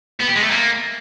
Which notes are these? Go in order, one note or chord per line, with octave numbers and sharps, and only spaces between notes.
B3
G4
G#3
A3
A#3